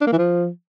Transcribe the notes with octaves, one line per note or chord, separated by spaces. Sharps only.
D4
A#3
E3
F3